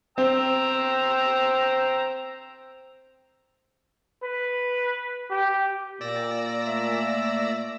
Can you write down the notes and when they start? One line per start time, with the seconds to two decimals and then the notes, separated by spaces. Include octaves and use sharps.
0.18 C4 C5 G5 A#5 E6
4.23 B4
5.31 G4
6.01 A#2 D5 E6 A#6
6.66 A3 E5